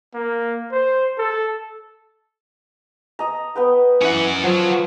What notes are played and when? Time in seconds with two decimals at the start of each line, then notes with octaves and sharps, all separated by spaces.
0.15 A#3
0.72 C5
1.18 A4
3.19 D#5 A#5
3.55 B3 B4 G5
4.01 E3 C#4 F#5
4.43 F3 F#3